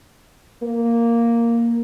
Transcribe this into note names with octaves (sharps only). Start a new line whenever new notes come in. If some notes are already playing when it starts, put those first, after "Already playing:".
A#3